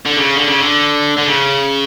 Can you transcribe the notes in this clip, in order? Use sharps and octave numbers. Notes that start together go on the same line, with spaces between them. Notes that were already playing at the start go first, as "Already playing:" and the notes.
D3
C#3
D3
C#3
D3
D3
C#3